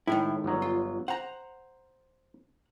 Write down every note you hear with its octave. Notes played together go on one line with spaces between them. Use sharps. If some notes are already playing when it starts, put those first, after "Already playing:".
A2 D#3 G#3 E4
G1 F#3
F4
C5 F#5 A#5